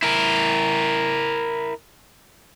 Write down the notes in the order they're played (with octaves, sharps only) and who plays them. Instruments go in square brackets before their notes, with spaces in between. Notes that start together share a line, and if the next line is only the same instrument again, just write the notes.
[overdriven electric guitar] E4 A#4